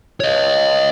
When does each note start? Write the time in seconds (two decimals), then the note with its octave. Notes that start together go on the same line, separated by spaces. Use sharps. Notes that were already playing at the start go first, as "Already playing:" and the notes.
0.20 C#5 D#5